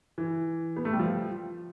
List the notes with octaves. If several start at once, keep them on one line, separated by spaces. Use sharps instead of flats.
E3
B3
A3
G3
F3